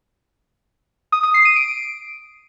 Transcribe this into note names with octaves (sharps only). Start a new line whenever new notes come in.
D#6
D#6
C7
D#7
D7